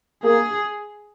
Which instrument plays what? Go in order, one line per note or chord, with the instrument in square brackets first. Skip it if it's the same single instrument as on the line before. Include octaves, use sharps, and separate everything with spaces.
[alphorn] A#3 [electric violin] G#4